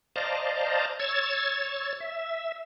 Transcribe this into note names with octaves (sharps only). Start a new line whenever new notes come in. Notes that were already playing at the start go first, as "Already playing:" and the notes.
C5 D5 D#5 F5 A5 A#5
C#5 E6 G#6 A6
E5